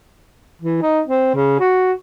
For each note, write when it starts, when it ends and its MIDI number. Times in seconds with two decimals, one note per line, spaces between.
0.62 0.80 52
0.82 1.01 63
1.07 1.33 60
1.34 1.59 49
1.60 1.93 66